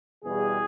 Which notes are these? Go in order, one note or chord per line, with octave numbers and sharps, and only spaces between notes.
E2 B2 G3 G#4